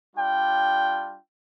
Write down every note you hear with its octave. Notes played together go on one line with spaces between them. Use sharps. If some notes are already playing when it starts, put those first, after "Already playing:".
G3 D4 F4 G5